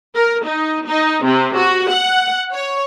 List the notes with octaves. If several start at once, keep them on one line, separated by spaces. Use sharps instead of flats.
A#4
D#4
D#4
C3
F#4
F#5
C#5